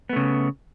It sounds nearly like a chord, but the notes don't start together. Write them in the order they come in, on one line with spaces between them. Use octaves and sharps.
B3 A3 C#3